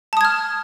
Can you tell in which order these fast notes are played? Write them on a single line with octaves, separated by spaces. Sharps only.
A5 D#6 G#6 F6